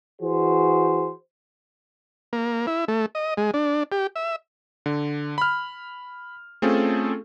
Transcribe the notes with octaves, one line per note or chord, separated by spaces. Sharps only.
E3 F#4 G#4 C5
A#3
E4
A3
D#5
G#3
D4
G4
E5
D3
B5 F6
A3 C4 C#4 F4 G#4 A4